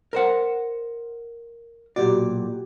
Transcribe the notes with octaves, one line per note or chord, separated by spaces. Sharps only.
A#4 C5 F#5
B1 A#2 F#4 G4 D5